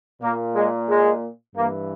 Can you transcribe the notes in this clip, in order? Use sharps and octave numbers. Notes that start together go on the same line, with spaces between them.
A#2 A#3
G#3
G#3
G2 E3 A#3